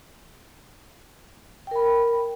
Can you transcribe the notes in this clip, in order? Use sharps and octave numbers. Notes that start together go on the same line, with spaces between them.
A#4 G5 B5